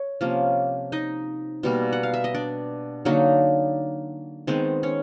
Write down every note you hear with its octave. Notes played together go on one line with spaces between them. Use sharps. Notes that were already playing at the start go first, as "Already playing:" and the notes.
Already playing: C#5
C3 F3 A#3 C#4
D#4 D#5
B2 G3 A#3
F#5
F5
E5
D#5
D4 D5
D3 F#3 A#3 D#4
D#3 G#3 B3 C4 C5
C#4 C#5